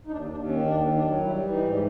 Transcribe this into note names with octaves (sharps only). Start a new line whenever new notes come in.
D#4
D#2 D4
D#2 D4
D#3 C#4
D#2 D4
D#3
D4
F#3
G3 E4
E3
D#4
G#2
G4